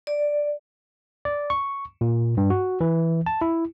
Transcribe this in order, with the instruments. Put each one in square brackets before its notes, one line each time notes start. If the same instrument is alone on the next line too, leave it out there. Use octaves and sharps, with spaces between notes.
[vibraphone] D5
[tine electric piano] D5
C#6
A#2
G2
F#4
E3
A5
E4